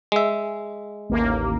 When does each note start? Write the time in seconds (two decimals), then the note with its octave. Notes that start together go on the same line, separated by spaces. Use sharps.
0.12 G#3 E5
1.10 A1 D#2 A#3